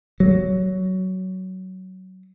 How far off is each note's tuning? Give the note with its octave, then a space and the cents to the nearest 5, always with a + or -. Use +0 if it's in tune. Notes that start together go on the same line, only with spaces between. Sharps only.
F#3 +15